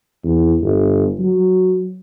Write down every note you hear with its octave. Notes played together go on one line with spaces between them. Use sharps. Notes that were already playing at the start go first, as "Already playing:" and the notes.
E2
G1
F#3